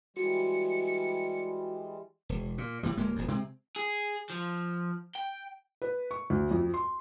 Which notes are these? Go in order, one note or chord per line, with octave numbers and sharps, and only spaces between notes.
E3 G3 G#3 F#4 C#7
E1
A#2
A2 E3 G3
D1 G#3 A#3
D#1 F2
C3 G#3 C4
G#4
F3
G5
B4
C#6
D2
F2
C6